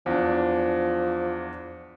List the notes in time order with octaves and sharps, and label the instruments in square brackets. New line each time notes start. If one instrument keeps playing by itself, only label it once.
[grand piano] E2 D4 [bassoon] F3